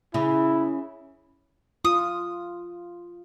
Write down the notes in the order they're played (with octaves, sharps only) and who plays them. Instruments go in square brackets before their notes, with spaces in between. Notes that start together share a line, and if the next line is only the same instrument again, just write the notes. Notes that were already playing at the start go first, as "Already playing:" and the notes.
[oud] C#3 [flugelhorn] E4
[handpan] F4 [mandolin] D#6